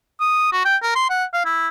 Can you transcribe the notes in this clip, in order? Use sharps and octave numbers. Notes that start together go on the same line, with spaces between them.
D#6
F#4
G5
A#4
C6
F#5
F5
E4